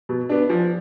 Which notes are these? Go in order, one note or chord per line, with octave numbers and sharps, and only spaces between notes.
B2
B3 D4
F3